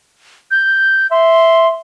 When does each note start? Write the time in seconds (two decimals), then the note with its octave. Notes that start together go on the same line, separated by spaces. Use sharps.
0.51 G6
1.11 E5 C6